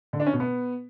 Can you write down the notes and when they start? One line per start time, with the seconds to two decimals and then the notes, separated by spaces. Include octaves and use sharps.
0.13 D3
0.20 D4
0.26 C#4
0.33 B2
0.40 B3